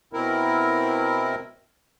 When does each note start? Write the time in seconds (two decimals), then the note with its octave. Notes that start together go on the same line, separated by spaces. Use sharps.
0.13 B2 C4 E4 A#4